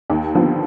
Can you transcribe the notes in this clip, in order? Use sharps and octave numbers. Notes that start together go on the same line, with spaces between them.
D#2
D3 F3 B3